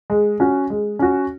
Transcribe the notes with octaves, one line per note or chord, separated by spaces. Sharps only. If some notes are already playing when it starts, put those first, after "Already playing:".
G#3
C#4 F#4
G#3
C#4 F#4